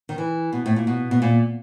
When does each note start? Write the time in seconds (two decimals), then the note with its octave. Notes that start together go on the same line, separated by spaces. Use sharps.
0.09 D#3
0.18 E3
0.53 B2
0.66 A2
0.76 A#2
0.87 B2
1.11 B2
1.22 A#2